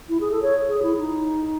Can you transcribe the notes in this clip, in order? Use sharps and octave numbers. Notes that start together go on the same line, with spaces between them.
E4
G#4
A4
C#5
G#4
E4
D#4